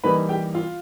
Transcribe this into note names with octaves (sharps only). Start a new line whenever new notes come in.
E3 G3 A#3 D#4 B4 B5
G4 G5
F4 F5